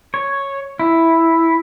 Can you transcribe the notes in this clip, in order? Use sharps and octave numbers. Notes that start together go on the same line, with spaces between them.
C#5
E4